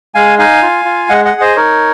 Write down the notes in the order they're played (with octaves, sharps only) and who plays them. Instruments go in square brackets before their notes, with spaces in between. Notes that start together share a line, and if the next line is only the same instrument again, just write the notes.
[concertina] G#3 F5 G#5
D#4 F5 G#5
F4
F4
G#3 D#5 F#5
D#5 F#5
G#4
C5 D#5
D#4 A#4 C#5